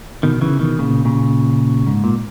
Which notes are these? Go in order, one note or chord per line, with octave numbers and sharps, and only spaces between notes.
B2 D#3
C#3 E3
B2 D#3
A#2 C#3
A#2 C#3
G#2
A#2